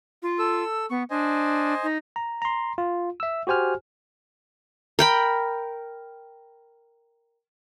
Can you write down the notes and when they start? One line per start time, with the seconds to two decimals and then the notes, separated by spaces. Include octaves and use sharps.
0.23 F4
0.39 A4 E6
0.90 B3 C#6
1.10 D4 C5 D#5 G#5
1.83 D#4
2.16 A#5
2.42 A#5 C6
2.78 F4
3.20 E5 E6
3.47 F#4 G4 C5 G#5 F6
4.99 A#4 G5 B5